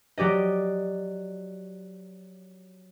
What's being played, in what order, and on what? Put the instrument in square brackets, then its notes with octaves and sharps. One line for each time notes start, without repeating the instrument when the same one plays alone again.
[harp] F#3 G4 D5 D#5